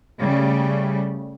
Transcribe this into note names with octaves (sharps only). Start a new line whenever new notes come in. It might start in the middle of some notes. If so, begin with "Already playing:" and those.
C#3 G3 A3